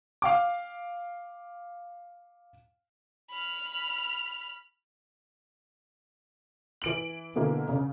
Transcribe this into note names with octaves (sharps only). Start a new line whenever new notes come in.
F5 G5 D6
B5 F6
E3 D7 F#7
B2 D3 E3 A#3
C#3